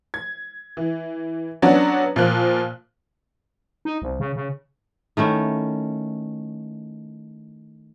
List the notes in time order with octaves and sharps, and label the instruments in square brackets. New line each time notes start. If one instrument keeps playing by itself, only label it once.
[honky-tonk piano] G#6
E3
F#3 B3 C#4 D4 F#4
A#2 F3 A#3 F#6
[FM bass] D#4
C2
C#3
C#3
[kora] D#3 A3 C#4 E4